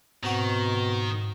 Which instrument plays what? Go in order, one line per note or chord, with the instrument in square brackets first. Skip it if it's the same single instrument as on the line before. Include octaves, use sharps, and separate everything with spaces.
[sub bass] G#2 [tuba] B2 [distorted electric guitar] D#3 [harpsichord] C4 F#4